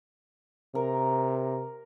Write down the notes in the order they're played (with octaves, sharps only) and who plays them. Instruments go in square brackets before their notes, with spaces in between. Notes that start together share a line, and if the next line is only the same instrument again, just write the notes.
[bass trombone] C3 [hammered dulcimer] A#4